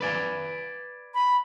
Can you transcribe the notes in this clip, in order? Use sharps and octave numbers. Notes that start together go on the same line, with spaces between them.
B4 D5 G#5
B5